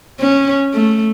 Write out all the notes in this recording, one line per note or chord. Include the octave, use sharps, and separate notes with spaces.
C#4
A3